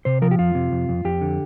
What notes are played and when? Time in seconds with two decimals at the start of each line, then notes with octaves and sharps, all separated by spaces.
0.05 C3 C5
0.22 F3 A#4
0.31 G4
0.39 F2 F4
0.55 C3
0.72 F2
0.89 F2
1.05 F2 G4
1.21 D3